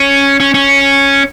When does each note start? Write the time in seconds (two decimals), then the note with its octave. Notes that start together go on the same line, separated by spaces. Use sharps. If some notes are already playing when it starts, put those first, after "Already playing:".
Already playing: C#4
0.40 C#4
0.54 C#4